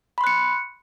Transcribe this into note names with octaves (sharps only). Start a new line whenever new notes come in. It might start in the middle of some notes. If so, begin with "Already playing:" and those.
B5 C6 F#6 C#7